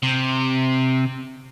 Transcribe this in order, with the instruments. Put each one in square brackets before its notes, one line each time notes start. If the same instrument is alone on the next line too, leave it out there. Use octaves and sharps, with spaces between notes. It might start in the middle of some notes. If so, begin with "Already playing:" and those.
[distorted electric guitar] C3